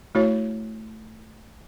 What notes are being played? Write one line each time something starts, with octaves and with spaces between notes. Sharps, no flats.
A3 E4 F#4 C#5